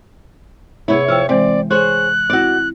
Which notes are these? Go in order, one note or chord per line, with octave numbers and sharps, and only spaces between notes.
C3 B3 E4 G#4 C#5
F3 G5 E6 F6
E3 G#3 C4 D5
G#4 C5 C#5 F#6
C4 E4 F#4 D5